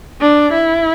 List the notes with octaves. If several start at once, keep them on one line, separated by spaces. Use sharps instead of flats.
D4
E4